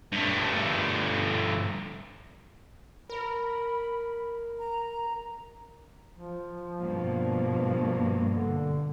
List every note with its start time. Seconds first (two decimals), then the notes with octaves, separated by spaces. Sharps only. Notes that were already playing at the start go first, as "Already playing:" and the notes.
0.12 G2 A3
3.10 A#4 B5
4.59 A#5
6.14 F3
6.79 G2 B2 A#3
8.29 D3